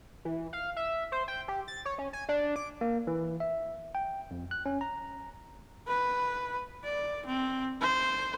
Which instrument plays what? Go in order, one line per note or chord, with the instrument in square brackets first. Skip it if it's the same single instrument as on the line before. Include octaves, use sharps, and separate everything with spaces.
[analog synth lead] E3
F5
E5
C5
G5
G4
A6
C#5
C#4
G#5
D4
D6
[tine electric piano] A#3
E3
E5
G5
F2
F#6
C#4
A#5
[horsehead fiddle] B4
D5
C4
C5